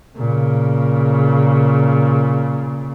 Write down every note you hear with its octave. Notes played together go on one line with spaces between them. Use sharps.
A#2 C#3